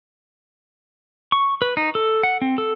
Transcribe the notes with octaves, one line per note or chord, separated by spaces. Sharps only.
C#6
B4
D#4
A4
F#5
C4
A4